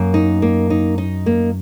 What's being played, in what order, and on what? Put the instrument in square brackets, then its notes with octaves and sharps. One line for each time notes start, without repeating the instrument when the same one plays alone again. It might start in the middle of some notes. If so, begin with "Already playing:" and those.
Already playing: [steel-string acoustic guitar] F#2 [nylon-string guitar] A#3
[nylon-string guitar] D#4
A#3
D#4
D#4
A#3